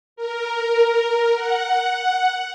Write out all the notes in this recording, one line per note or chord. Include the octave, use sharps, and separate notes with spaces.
A#4
F#5